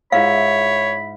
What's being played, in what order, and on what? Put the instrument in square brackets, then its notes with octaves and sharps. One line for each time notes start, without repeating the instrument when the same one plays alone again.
[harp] G#2 E4 F4 [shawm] C#5 [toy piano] F5 [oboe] B5